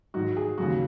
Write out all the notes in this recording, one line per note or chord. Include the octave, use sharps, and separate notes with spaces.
G#2 D#3 F#3 F#4
G#4
D#2 C#3 F#3 F#4